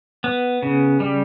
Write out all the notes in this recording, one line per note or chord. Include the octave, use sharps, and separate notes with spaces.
B3
C#3
G3